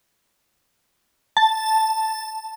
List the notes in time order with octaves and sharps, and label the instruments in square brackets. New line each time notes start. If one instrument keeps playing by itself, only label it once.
[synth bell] A5